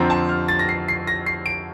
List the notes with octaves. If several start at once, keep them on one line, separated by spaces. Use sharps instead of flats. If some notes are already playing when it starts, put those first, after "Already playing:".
Already playing: F2 D3 F3 C4 F4 A#5
A5
F6
A6
A#6
C7
C7
A#6
C7
D7